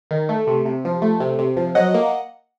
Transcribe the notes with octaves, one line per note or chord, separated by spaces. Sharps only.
D#3
A3
C3
C3
F3
A3
C3
C3
F3
F#3 D#5 F#5
A#3